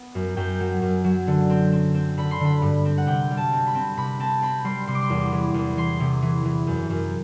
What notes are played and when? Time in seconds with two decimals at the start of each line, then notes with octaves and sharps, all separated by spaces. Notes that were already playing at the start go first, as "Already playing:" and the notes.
Already playing: B3
0.15 F#2
0.37 F#2 G5
0.60 F#3
0.82 F#2
1.04 F#3
1.27 D3
1.50 C4
1.72 C4
1.95 C4
2.18 D3 B5
2.31 C6
2.40 D3 B5
2.62 G2
2.85 C4
2.98 F#5
3.07 C3 G5
3.30 G3
3.37 A5
3.52 C4
3.67 B5
3.75 C4
3.97 C3 B5
4.20 C4 A5
4.42 C4 B5
4.64 G3 C6
4.87 C3 C6
4.95 D6
5.02 C6
5.10 E2
5.32 E3
5.54 E2
5.77 E3 C6
6.00 C3
6.22 E3
6.45 E3
6.67 F#2
6.90 F#2